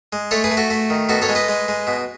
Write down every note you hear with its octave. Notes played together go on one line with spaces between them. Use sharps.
G#3
A3 A4 C#5
G#4 B4
A3
F#4 A4
A3
D#3
B2 F#4 A4
A4 C#5
G#3
B4 D#5
G#3
G#3
B2